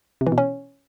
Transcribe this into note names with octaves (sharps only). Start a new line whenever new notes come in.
C3
E3
B2
C#4